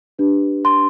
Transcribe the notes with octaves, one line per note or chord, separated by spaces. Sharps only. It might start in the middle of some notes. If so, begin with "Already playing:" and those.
D4 G4 B4
C6